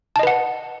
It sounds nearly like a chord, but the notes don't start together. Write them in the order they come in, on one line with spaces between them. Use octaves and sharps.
A5 D#5 B4 F#5